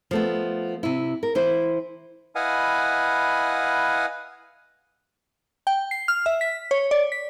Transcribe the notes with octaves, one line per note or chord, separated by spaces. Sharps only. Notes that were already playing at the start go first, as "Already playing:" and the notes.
F3 A3 B3
C3 E4
A#4
E3 E4 C5
E4 B4 D#5 F5 F#5 G#5
G5
C7
F6
E5
B6
C#5
D5
B6